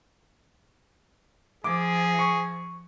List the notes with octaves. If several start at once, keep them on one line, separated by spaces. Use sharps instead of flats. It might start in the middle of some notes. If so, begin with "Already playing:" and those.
F3 G#4 D6
C#6